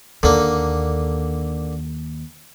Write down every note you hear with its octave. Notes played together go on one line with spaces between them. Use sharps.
D#2 D3 A#3